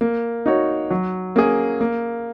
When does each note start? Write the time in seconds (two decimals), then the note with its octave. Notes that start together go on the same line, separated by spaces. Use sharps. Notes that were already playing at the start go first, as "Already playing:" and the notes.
0.01 A#3
0.46 D#4 F#4 C#5
0.91 F#3
1.36 A#3 C#4 G#4
1.81 A#3